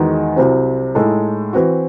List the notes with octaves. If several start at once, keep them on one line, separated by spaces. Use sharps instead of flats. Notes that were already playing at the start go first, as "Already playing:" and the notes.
Already playing: E2 D#3 G#3 D#4 F#4
C2 C3 F#3 C4
A2 G#3 D#4 A4 D#5
E3 C4 F#4